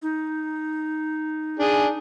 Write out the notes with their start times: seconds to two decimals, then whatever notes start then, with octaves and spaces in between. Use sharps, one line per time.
0.02 D#4
1.59 D4 G#4